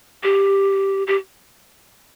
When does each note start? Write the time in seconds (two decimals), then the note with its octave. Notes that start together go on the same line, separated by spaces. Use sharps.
0.23 G4
1.07 G4